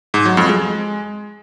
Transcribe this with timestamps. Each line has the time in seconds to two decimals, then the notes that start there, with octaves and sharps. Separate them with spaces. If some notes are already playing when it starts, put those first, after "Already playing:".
0.14 G#2
0.25 F#3
0.37 F2
0.49 G#3